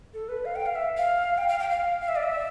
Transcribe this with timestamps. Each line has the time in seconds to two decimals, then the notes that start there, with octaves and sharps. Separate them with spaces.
0.14 A4
0.29 B4
0.45 F5
0.56 G5
0.66 F5
0.75 E5
0.97 F5
1.38 G5
1.48 F5
1.59 G5
1.70 F5
2.01 F5
2.08 E5
2.16 D5
2.23 E5